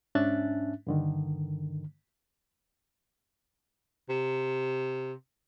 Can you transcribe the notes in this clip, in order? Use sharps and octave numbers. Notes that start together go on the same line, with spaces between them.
G#2 C#4 D4 E5 F#6 A6
G2 D3 D#3
C3